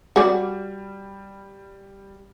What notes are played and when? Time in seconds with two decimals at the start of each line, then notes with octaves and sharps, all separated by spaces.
0.16 G3 F#4 D5